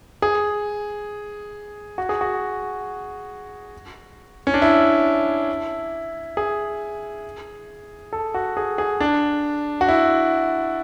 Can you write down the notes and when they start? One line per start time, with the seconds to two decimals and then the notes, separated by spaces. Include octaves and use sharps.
0.22 G#4
1.98 F#4
2.09 G#4
2.21 F#4
4.47 C#4
4.54 D4
4.62 E4
6.37 G#4
8.13 A4
8.34 F#4
8.57 G#4
8.78 G#4
9.00 D4
9.81 F#4
9.88 E4